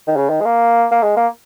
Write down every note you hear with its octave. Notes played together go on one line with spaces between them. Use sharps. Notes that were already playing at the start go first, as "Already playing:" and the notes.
D#3
C#3
D#3
G#3
A#3
A#3
G#3
A#3